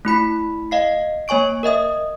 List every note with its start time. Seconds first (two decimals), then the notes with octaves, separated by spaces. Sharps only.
0.05 A3 E4 B5 B6
0.71 D#5 F5 C7
1.28 A#3 C#5 G#5 C#6 D7
1.63 A#4 D#5 E5 D#6